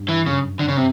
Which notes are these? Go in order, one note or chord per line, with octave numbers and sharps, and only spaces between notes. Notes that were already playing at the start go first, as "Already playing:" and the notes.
Already playing: G2
E3
F#2 C#3
D3
C#3
C3